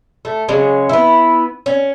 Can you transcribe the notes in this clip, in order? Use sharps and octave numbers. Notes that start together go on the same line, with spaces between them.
A3
C#3 F#3 G#3 C#4
B3 E4
C#4